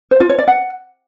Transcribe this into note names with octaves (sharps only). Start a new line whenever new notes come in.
C5
F4
C#5
D5
F#5